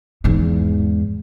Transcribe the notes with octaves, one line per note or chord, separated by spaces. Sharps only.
E2 G#2